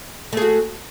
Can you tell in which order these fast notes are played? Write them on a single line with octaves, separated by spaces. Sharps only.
A3 G#4 F#4